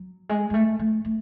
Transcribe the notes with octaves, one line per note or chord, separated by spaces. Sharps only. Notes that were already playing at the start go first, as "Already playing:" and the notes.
Already playing: F#3
G#3
G#3
A3
A3
A3